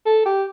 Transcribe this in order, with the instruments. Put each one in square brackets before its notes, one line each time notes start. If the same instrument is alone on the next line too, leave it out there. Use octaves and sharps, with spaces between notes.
[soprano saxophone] A4
G4